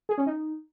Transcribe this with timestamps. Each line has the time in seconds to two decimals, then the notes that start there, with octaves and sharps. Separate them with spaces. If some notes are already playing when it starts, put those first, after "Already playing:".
0.09 G#4
0.18 C#4
0.26 D#4